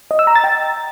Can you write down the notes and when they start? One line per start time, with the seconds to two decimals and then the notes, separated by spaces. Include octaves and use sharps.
0.11 D#5
0.19 E6
0.27 A#5
0.35 A6
0.44 G5